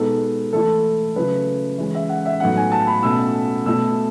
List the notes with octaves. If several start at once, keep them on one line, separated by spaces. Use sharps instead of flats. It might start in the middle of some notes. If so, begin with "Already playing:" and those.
Already playing: B2 G#3 B3 D#4 A4
E3 A3 E4 A4
C#3 F#3 A3 E4 B4
E3 G#3 C#4
E5
F#5
E5
A2 F#3 B3 D#4 F#5
G#5
A5
B5
B2 A3 C#4 E6
B2 A3 E4 E6